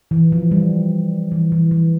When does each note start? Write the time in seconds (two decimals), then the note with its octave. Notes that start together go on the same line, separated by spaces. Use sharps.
0.11 E3
0.32 F3
0.51 G3
1.32 E3
1.52 E3
1.71 E3